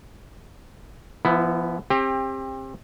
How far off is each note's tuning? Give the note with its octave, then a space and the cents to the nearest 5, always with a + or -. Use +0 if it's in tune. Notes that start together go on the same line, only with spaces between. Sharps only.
F3 -35 B3 +0 E4 +0
C4 +30 G4 +25